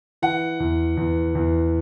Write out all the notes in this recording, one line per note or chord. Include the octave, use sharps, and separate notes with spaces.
E3 F#5
E2
E2
E2